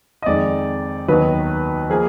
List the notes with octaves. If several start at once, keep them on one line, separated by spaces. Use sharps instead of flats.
D#5
F2 D#3 G#3 D#4 D5
D#2 D#3 F#3 B3 D#4 B4
F3 A#3 G#4